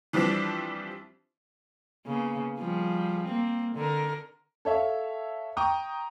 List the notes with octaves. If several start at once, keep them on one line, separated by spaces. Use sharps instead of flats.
E3 F3 G3 C4 D4
C#3 A#3 B3
F3 G3 G#4
A#3 C4
D3 A#4
A4 C#5 E5 F5
G5 A#5 C#6 D#6